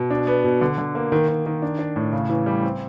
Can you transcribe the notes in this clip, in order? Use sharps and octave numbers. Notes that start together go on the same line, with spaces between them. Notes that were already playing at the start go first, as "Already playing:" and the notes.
Already playing: B2
D4
B3
B2
D3
D3
A#3
D#3
D#3
D#3
D4
D4
A2
C#3
E3
G3
C4